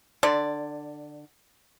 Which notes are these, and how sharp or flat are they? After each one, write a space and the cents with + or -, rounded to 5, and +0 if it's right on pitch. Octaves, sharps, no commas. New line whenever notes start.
D3 +20 D5 +0